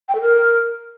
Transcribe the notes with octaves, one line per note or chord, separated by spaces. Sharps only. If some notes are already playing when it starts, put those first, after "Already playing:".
G5
A4
A#4